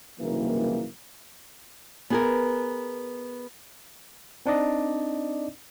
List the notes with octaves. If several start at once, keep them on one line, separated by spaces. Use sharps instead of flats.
F#1 C2 D#3 E3 A#3
B3 G#4 A#4
C4 D4 D#4 D5 D#5